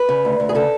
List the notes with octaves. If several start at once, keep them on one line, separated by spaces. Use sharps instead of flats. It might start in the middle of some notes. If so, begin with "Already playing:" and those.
Already playing: B4
C#3
D2
D2
G#4
C#3 A4